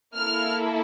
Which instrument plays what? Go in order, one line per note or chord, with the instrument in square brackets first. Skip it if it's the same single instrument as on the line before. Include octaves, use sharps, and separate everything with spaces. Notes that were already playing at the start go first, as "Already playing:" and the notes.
[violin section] A#3 E4 A4 F6